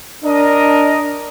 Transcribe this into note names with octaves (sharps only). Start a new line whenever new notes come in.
D4 A#4 D#5